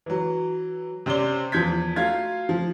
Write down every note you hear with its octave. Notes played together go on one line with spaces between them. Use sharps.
E3 F#3
C3 C4 C#4 C5 D5 G7
E2 F3 G6 G#6 B6
F#3 A3 F4 F5 G#6
F3